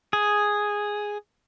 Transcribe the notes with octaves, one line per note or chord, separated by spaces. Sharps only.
G#4